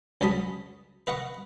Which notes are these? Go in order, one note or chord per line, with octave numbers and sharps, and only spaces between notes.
C#2 F#3 A5 B5 D#6
B4 D#5 F#5 C#6